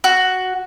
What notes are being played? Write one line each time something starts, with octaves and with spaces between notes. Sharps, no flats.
F#4